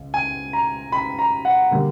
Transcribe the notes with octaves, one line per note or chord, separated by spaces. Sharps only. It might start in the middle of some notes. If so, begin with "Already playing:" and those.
Already playing: C#2
G#5
A#5
B5
A#5
F#5
D3 G3 A#3